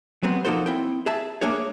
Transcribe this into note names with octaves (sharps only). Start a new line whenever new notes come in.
F#3 G#3 B3 C4
F3 A#3 D#4 F#4 A4 C5
C4 E4 G5
G#4 E5 A5
A3 A#3 D4 G#4 C#5